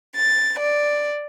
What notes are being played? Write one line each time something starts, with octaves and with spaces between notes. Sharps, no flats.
A6
D5